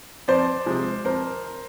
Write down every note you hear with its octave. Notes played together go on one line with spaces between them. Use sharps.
F2 C5 D5
C3 F3 G#3
F2 A#4 C5